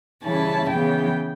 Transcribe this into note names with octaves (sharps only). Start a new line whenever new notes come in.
C#3 E3 G3 C#4 E4 A5
C#3 E3 B3 G5